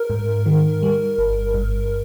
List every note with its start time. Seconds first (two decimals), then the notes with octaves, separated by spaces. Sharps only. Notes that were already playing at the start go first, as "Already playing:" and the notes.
Already playing: A#4
0.10 G#2
0.46 D#3
0.83 G3
1.18 G1
1.54 G2